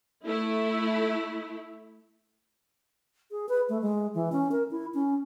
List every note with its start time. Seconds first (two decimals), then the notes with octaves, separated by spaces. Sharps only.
0.25 A3 E4
3.31 G#4
3.49 B4
3.69 A3
3.82 G#3
4.14 E3
4.32 C#4
4.52 A#4
4.71 E4
4.94 C#4